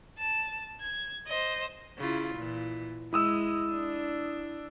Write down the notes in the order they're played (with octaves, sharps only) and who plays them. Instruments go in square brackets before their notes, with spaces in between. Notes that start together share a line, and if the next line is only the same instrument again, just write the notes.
[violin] A5
G#6
C5 D#5
[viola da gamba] C#3 E4 F4
A#2 E3
[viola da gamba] G#3 [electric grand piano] E4 D#6 E6
[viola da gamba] D4